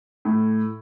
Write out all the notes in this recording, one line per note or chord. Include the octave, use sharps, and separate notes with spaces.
A2